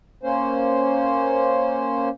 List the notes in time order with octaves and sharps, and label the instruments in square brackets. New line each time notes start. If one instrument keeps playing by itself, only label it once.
[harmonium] A#3 C#4 C5